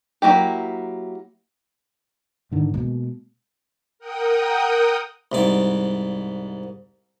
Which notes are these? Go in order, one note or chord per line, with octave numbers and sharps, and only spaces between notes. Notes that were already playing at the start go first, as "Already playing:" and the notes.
F#3 G#3 A#3 E4 G4
G#2 D3 D#3
B2 G#3 A#3
A#4 F#5 G5 D#6
C2 G#2 D5